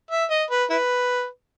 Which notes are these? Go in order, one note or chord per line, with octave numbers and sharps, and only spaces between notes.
E5
D#5
B4
E4 B4